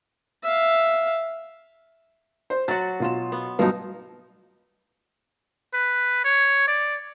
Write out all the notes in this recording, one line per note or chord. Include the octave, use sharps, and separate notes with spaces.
E5 F5
C5
F#3 F#4 A6
B2 F4 E7
B3
B1 G2 F3 B3 D#4
B4
C#5
D5